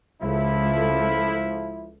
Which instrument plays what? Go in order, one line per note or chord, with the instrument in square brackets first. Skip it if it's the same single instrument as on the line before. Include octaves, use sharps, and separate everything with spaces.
[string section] C#2 A4 [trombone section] F3 E4